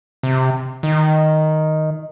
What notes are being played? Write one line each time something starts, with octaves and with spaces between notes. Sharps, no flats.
C3
D#3